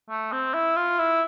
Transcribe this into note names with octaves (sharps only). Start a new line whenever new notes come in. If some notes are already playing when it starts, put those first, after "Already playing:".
A3
C4
E4
F4
E4